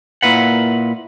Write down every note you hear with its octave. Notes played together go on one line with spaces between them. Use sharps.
A#2 A#3 E4 B4 F#5